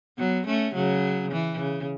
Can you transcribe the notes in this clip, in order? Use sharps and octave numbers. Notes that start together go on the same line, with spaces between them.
F#3 B3
A3 C#4
C#3 F#3
E3
C#3